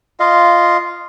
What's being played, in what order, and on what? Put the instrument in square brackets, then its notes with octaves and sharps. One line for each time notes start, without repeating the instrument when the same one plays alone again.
[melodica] F4 D#5 F5